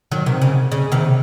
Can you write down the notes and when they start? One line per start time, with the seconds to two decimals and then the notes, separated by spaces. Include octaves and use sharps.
0.11 D#3 F#3
0.26 C3 D#3
0.42 C#3
0.72 C#3
0.92 C3 D#3